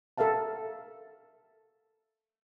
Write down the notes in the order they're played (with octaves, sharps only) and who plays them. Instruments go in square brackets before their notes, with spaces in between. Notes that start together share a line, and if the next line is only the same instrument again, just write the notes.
[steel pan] A4 A#4 E5 F5 A5